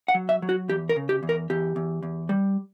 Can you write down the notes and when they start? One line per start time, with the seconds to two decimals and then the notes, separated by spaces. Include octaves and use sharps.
0.08 F#5
0.15 F#3
0.29 E5
0.42 F#3
0.49 F#4
0.69 E2 G4
0.89 A#4
0.96 C#3
1.09 G4
1.23 E2
1.29 A#4
1.50 E2 G4
1.76 E2
2.03 E2
2.29 G3